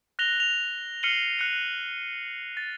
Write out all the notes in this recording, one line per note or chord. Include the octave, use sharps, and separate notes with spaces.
F#6 A#6 F7 G7
F#6 F7
F6 C7 C#7 D#7 F#7 G7
F#6 C#7
A6